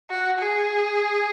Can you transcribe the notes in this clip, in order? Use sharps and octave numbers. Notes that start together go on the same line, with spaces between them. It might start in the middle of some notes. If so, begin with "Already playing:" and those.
F#4
G#4